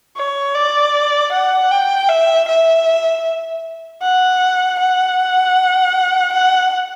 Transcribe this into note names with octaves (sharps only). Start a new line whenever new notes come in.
C#5
D5
F#5
G5
E5
E5
F#5
F#5
F#5